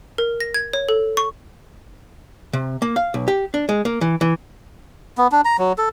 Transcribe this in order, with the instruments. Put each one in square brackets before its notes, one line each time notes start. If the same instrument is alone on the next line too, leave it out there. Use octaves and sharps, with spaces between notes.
[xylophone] A#4
A#6
G#6
C#5
A4
C#6
[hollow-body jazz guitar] C3
A#3
F5
B1
G4
D4
G#3
A#3
E3
E3
[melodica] B3
D4
A#5
F#3
A4